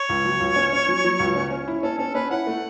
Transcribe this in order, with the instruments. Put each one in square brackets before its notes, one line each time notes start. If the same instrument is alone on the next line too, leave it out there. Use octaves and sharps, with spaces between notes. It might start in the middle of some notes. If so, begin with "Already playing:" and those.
Already playing: [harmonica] C#5
[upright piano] C#2
F#3
C#2
C#4
C#4
F#3
F#3
C#2
C#4
C#4
E4
[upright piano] C#4 [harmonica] A4
[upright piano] C#4 [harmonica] A4
[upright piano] C#4 [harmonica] B4
[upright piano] E4 [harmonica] F#5
[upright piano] A3